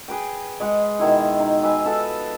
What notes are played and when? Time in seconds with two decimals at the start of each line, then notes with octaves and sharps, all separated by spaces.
0.08 G#4 B4 G5
0.60 G#3 D#5 F#5
0.99 B2 D#3 E4
1.40 D#4
1.62 B4 E5 G#5 C6
1.86 B3 F4 A4